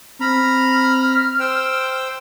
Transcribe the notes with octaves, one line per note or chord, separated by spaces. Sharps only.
C4 A#5 B5 F6
C5 G5 E6